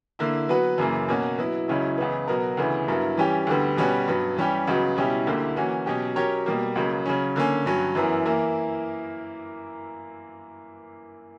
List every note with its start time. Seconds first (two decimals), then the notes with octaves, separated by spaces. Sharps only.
0.19 D3 A#3 E4
0.49 F#3 B3 F#4 B4
0.78 F#2 C#3 E3 A#3
1.08 B2 A#3 C#4 F#4
1.39 F#3 B3 E4
1.68 C#2 C#3 F#3 C#4 E4
1.98 C#2 C#3 E3 B3
2.28 B2 F#3 B3 F#4 A#4
2.57 D2 C#3 E3 B3 E4
2.88 G2 F#3 B3 E4 A#4
3.17 E3 G3 C#4 G4
3.47 D2 D3 G3 B3
3.77 B2 G3 C#4 F#4 B4
4.08 G2 F#3 B3
4.36 E3 G3 C#4 G4
4.67 C#2 C#3 F#3 B3 F#4
4.97 B2 G3 C#4 E4 G4
5.27 D2 D3 A#3 E4 G4
5.56 E3 A#3 C#4 F#4
5.86 B2 F#3 C#4 G4
6.16 F#3 C#4 G4 A#4 C#5
6.46 B2 G3 A#3
6.75 C#2 C#3 F#3 A#3
7.06 C#3 F#3 C#4
7.36 D3 A#3 C#4
7.66 G2 F#3 C#4
7.95 F#2 E3 B3 E4 A#4
8.25 E3 A#3 E4 A#4